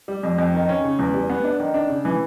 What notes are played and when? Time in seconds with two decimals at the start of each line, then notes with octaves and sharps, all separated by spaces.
0.08 G3
0.23 F2
0.38 F2
0.54 D#3
0.69 C#4
0.84 C#3
0.99 E2
1.14 G3
1.29 B3
1.44 D4
1.60 D#3
1.74 D4
1.89 C#3
2.05 E3